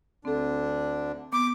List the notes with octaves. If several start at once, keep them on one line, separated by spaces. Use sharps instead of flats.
D2 D3 C4 D4 A4
B3 D6